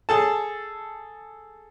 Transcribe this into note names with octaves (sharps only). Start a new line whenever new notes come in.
G#4 A4 A5